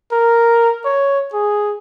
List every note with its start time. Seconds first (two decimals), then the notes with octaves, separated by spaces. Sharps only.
0.12 A#4
0.85 C#5
1.34 G#4